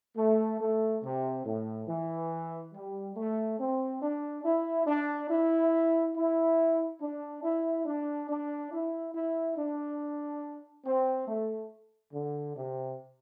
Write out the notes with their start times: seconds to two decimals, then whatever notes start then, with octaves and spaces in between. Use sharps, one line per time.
0.16 A3
0.59 A3
1.02 C3
1.45 A2
1.87 E3
2.73 G3
3.16 A3
3.59 C4
4.01 D4
4.44 E4
4.86 D4
5.29 E4
6.14 E4
7.00 D4
7.43 E4
7.85 D4
8.29 D4
8.72 E4
9.14 E4
9.56 D4
10.85 C4
11.27 A3
12.13 D3
12.57 C3